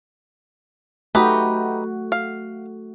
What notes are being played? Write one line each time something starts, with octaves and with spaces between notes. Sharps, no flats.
A3 D#4 F#4 G4 B4
F5